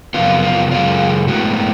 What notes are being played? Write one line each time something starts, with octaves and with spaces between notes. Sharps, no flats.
F#2 C#3 F3 B3 F4
F4
F#2 C#3 G#3 F4
A2 G#3 B3 F#4